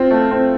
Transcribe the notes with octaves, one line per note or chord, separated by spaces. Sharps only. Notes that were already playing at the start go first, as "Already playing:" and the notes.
Already playing: C4 F4
A3
C4